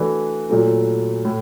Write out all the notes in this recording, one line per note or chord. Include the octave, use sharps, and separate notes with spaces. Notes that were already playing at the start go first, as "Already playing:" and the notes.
Already playing: E3 A3 D4 F#4 B4
A#2 F#3 A3
A2